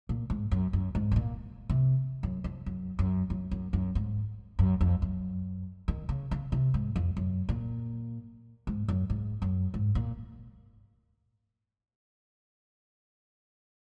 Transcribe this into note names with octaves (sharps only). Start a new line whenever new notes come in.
A#2
G#2
F#2
F#2
G#2
C3
A#2
C3
F#2
F2
F#2
F#2
F#2
F#2
F#2
G#2
F#2
F2
F#2
D#3
C#3
C#3
C3
G#2
F2
F#2
A#2
G#2
F#2
G#2
F#2
G#2
A#2